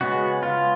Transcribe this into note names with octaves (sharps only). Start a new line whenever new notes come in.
C#3 G#3 B3 F#4
F4